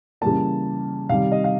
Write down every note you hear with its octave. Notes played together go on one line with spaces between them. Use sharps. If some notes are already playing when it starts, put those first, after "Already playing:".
C#3 E3 G3 A#3 A5
C3 D#3 G3 F5
D#5
F5